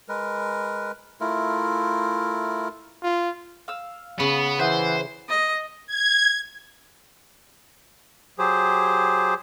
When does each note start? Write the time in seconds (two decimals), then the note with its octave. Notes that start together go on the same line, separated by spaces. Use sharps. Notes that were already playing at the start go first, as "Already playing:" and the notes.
0.09 G#3 A#4 B4
1.21 A3 E4 F4 A#4
3.03 F4
3.68 F5 E6
4.20 C#3 B3
4.59 E3 C5 E5 F#5 D#6
5.29 D#5
5.87 G#6
8.39 F#3 G4 G#4 C5